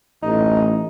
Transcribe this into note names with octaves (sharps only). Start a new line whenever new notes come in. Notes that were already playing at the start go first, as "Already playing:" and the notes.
A1 D#4